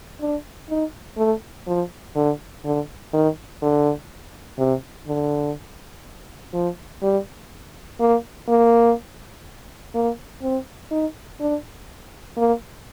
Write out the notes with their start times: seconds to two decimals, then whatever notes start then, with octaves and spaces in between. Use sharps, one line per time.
0.21 D4
0.69 D#4
1.17 A3
1.67 F3
2.15 D3
2.65 D3
3.13 D#3
3.62 D3
4.58 C3
5.07 D3
6.53 F3
7.03 G3
8.00 A#3
8.48 A#3
9.94 A#3
10.42 C4
10.91 D#4
11.40 D4
12.37 A#3